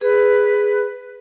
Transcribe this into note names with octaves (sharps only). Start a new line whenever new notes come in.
G#4 B4